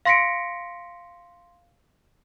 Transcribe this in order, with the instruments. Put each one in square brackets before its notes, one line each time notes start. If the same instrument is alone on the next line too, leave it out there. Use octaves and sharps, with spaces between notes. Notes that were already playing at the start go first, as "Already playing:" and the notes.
[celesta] F5 C6 A#6 B6 C#7 D7